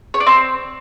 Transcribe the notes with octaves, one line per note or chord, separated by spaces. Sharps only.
C#5
D5
C4